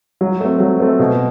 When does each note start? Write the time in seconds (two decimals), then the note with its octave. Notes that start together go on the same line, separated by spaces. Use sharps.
0.21 F#3
0.41 A3 C4
0.60 F#3
0.80 A3 C4
1.00 B2